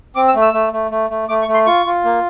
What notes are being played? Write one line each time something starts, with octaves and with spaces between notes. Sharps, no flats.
C4 D6
E6
A3
E6
A3
A3
A3
A3
A3 D6
C#6
A3
C6
F4 C#6
F4
A#3